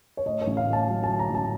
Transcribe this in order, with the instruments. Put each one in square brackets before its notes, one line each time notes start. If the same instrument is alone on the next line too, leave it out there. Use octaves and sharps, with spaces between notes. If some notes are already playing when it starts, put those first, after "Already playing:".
[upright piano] C#5
A2 D#5
C#5
A1
F5
A2
A5
F#3
A5
F#3
A#5
A1
A5